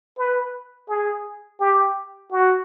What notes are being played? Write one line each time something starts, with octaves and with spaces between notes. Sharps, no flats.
B4
G#4
G4
F#4